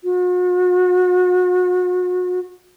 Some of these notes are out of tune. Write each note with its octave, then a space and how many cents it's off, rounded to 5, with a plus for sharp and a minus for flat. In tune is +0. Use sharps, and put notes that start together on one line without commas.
F#4 -40